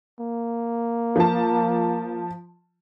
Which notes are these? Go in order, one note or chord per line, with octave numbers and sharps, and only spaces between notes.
A#3
F3 A5